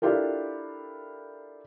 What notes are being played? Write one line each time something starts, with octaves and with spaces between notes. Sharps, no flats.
D4 E4 F4 G4 A4 A#4